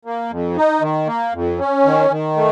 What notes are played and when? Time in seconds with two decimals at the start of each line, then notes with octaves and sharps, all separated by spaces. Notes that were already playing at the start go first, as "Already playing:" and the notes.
0.05 A#3
0.31 F2
0.56 D#4
0.81 D#3
1.07 A#3
1.33 F2
1.59 C#4
1.85 D#3
2.10 D#3
2.36 A3